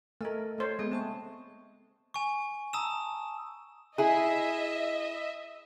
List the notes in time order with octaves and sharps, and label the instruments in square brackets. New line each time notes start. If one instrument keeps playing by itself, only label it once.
[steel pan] A3 A#4 [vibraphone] A4 D#5
[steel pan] A3 C5 C#5
[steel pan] G#3 [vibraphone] A#3 B3 G#4
[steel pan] C4 [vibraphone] E5 A5 C#6
[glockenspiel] G#5 C#6
A5 A#5 D#6 E6 E7
[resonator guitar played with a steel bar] E4 G#4 [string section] D#5 E5